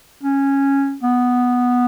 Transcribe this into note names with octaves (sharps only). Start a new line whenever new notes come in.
C#4
B3